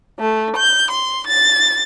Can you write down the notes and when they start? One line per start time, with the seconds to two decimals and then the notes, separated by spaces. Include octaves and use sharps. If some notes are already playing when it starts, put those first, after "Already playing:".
0.18 A3
0.56 G6
0.90 C6
1.25 A6